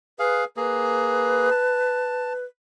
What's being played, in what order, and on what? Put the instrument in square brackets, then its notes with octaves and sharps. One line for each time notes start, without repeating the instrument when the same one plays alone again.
[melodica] G#4 F5 [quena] B4
[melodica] A#3 G#4 [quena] B4
[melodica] A5